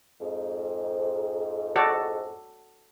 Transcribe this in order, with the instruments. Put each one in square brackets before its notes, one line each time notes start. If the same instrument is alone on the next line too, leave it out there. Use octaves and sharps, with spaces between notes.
[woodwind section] F2 G#2
[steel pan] F#4 A4 D5